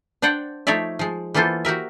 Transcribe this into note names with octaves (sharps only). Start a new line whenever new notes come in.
D4 C5 D5 F#5 G5
F3 A3 D#4 C#5 D5 E5
F3 G#3
E3 A#3 B3 F4 A4 C5
F#4 G4 A#4 E5